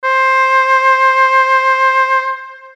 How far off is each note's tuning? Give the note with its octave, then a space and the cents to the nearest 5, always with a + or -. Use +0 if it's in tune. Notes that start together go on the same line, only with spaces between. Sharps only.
C5 +15